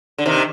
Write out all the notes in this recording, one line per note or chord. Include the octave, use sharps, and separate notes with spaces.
D3
C3 D#3